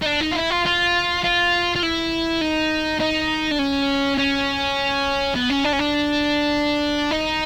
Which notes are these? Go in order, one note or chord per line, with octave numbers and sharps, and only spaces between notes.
D#4
D4
D#4
F4
E4
F4
F4
F4
F4
E4
D#4
D#4
D4
C#4
C#4
B3
C#4
D4
C#4
D4
D#4